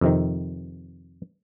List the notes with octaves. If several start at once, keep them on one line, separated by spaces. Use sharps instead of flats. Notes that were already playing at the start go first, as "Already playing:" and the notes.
F2 C3 D#3